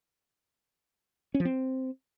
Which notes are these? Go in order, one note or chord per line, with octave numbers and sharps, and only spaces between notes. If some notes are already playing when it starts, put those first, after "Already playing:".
C#4
F3
C4